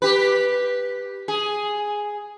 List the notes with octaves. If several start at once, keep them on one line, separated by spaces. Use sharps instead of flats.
G4 B4
G#4